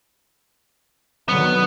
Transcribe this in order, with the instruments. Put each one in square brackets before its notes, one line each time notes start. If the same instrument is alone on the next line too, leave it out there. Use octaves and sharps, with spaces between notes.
[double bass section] D3 D#3 F#3 [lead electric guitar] B3